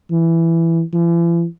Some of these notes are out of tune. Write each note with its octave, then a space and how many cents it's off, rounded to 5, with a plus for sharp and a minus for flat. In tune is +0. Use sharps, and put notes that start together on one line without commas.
E3 +10
E3 +45